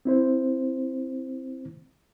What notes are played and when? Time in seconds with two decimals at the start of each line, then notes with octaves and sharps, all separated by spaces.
0.05 C4 E4 C5